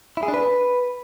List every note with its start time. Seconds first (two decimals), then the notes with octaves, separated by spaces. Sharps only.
0.17 E4
0.23 G#4
0.28 D4
0.34 B4